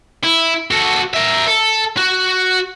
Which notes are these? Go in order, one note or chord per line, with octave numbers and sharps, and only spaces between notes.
E4
F#4 A4
A#4 E5
A4
F#4